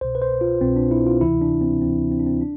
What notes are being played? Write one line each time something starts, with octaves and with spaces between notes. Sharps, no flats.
C2 B2 C5
B4
C5
F4
C2 B2 C4
D4
E4
F4
D2 C3 E3 E4
D4
C4
D2 C3 E3 C4
C4
D4
C4
D4